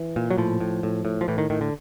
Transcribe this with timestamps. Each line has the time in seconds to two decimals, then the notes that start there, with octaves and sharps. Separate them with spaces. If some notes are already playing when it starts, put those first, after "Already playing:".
Already playing: E3
0.16 A#2
0.31 F#3
0.38 A2 F3
0.61 A2
0.83 A2
1.05 A2
1.21 F3
1.28 A2 E3
1.38 D#3
1.50 A2 D#3
1.61 D3